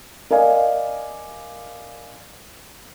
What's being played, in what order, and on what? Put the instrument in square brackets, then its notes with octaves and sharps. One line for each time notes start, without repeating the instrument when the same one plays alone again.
[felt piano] A#4 D5 D#5 F5 G#5